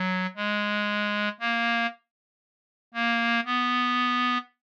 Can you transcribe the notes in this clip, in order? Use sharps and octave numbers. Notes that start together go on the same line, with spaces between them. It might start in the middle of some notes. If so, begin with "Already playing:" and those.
Already playing: F#3
G#3
A#3
A#3
B3